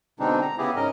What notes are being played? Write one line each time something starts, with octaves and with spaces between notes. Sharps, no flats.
B2 D3 G#3 C4 D4 D#4
A#5
C#3 B3 E4 G4 G#4
G#2 C#4 A#4 D#5